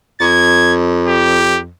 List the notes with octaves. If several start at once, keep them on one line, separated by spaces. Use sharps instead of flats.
F2 G#6
G4